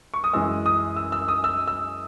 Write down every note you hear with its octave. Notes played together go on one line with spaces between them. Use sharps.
C#6
D#6
F#2 E3 G#3 E6
D#6
E6
E6
D#6
E6
E6